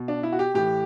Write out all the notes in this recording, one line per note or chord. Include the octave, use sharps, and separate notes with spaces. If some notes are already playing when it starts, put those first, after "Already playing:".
Already playing: B2
D4
E4
F#4
G4
A2 E3 G4